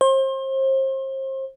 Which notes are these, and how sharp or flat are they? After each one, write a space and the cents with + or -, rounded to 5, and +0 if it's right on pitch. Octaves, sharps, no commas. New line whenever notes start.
C5 +35